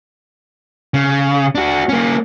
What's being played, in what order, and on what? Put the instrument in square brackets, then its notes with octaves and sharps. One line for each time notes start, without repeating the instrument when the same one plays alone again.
[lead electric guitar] C#3
D4 F#4
A#3 C#4